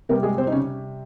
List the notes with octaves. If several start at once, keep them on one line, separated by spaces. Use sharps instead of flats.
C3 G3 A#3 A#4
G#3 G#4
C4 C5
D#4
C#3 C#4